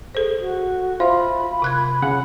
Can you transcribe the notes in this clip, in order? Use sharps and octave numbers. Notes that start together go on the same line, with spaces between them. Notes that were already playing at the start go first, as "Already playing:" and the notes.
G#4 A4 C5
F#4
F4 C5 E5 B5
C3 F#6 G#6
C#3 F#5